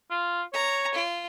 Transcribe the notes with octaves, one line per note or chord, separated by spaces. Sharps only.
F4
C#5 A#5
F4